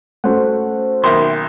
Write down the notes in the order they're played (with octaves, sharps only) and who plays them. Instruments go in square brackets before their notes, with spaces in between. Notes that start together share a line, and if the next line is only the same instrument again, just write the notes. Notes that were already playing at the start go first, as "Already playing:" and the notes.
[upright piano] A3 C#4 [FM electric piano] F#4 C5 F#5
[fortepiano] B1 D#3 A#3 [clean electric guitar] E5 C6